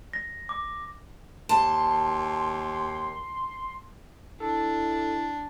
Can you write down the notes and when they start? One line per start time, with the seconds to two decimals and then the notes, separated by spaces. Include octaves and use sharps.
0.13 A#6
0.49 D6
1.49 D#2 A5 C6
4.40 D4 E4 A4